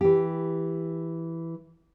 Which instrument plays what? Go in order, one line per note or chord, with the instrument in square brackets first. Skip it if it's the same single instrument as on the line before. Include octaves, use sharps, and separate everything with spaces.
[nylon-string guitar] E3 G4